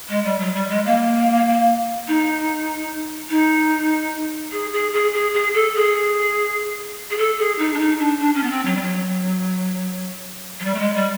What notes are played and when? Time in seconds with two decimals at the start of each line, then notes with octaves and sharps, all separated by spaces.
0.08 G#3
0.24 G3
0.39 F#3
0.54 G3
0.69 G#3
0.85 A#3
2.08 D#4
3.30 D#4
4.52 G#4
4.72 G#4
4.93 G#4
5.13 G#4
5.34 G#4
5.54 A4
5.75 G#4
7.10 G#4
7.18 A4
7.38 G#4
7.58 D#4
7.74 D4
7.78 D#4
7.99 D4
8.19 D4
8.34 C#4
8.43 B3
8.50 C4
8.65 F#3
8.75 G3
8.80 F#3
10.60 F#3
10.64 G3
10.74 A3
10.79 G#3
10.95 G3